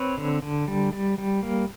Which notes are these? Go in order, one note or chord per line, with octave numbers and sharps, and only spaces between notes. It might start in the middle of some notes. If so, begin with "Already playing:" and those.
Already playing: C4 B4 C#5
D3
D3
G3
G3
G3
A#3